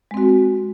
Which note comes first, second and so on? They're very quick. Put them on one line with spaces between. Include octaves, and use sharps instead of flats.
G#3 C4 F#4